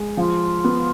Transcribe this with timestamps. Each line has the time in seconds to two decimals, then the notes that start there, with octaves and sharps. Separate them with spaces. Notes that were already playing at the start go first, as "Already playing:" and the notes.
Already playing: G#3
0.17 F3 F4
0.64 B3